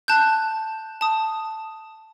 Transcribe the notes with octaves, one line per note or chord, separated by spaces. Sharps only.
A5 F#6 G6
A5 D#6